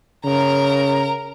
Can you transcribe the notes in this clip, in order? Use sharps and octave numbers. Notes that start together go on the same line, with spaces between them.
C#3 A#4 A#5